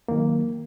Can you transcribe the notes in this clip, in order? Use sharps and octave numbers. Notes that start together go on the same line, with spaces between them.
D#2 D#3 F#3 A#3